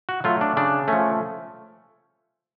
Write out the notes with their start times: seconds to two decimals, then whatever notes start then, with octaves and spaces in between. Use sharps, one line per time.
0.09 F#4
0.24 F#3 A3 F4
0.41 D4
0.57 C#3 D4
0.88 F3 A3 C#4